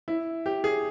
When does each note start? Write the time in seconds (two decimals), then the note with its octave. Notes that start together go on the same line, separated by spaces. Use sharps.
0.08 E4
0.46 G4
0.64 G#4